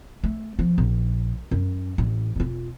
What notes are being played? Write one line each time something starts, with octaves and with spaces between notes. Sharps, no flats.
A3
F3
A#1
F#2
A1
E1 F4